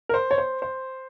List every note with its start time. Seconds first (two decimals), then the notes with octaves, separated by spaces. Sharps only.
0.09 A#4
0.14 C5
0.31 C#5
0.38 C5
0.62 C5